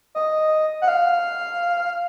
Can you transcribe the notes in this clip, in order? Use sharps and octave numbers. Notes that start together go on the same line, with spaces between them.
D#5
F#5
F5